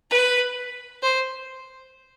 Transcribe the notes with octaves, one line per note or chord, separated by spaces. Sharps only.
B4
C5